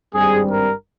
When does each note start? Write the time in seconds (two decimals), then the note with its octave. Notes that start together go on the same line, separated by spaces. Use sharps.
0.15 G#1 G2 G3 C4 G#4
0.50 A#4